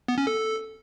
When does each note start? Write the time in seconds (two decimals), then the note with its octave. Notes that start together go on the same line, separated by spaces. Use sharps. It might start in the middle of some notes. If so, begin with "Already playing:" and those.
0.08 B3
0.18 C#4
0.27 A4